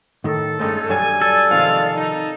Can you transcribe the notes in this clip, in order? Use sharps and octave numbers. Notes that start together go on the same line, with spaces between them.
A2 D#3 A4
G2 G#3 A3 C#4 D#4 G#4
G2 F#3 G3 G#5
A4 D5
C3 D#3 F3 G#3 F5
D#4